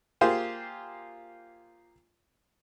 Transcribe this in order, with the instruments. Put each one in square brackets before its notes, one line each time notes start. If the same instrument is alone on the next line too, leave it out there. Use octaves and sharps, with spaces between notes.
[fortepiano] A#3 F4 G4 G#4 C5